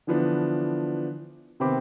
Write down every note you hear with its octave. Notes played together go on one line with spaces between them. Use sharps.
D3 E3 F3 B3 D4
C3 D#3 B3 C4 B5 D6